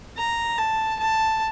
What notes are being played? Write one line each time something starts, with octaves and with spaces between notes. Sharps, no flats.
A#5
A5
A5